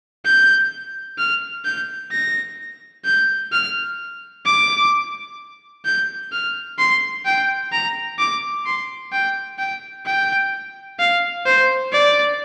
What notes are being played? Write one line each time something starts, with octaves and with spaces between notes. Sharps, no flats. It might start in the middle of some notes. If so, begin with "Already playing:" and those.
G6
F6
G6
A#6
G6
F6
D6
G6
F6
C6
G5
A#5
D6
C6
G5
G5
G5
F5
C5
D5